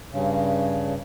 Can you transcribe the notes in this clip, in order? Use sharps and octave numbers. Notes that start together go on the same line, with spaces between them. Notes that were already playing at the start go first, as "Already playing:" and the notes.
G2 C#3